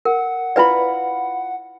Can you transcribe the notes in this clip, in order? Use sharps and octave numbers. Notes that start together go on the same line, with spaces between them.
A#4 F#5
E4 F4 B4 D5 G5 B5